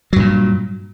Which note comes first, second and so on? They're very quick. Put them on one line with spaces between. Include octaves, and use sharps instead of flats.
F#3 G2 A#2